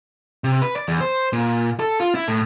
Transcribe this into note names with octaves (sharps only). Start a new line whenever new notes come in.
C3
B4
D5
E2
C5
A#2
A4
F4
E4
A2